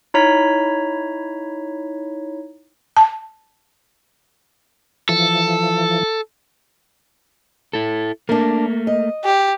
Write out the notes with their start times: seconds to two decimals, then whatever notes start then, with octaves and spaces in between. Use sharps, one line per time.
0.14 D#4 E4 C#5 A#5 B6
2.97 A5
5.09 E3 F3 A4
7.73 E4 A4
8.29 A3 A#3 D4 A#4
8.87 D#5
9.24 G4